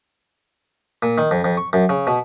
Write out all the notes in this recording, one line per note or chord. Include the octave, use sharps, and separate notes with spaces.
A#2
D#3
F2
F2
C#6
F#2
C#3
B2